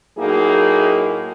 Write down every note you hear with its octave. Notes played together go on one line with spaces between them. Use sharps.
A2 F#3 A#3 D#4 G#4